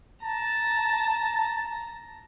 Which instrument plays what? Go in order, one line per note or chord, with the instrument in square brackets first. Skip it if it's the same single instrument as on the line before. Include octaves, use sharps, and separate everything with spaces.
[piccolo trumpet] A5 [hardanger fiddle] A#5